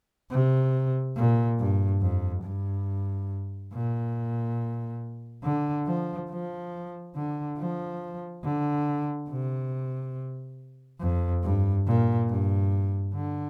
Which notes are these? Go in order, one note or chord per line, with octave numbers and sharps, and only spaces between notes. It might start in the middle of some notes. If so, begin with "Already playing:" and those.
C3
A#2
G2
F2
G2
A#2
D3
F3
F3
D3
F3
D3
C3
F2
G2
A#2
G2
D3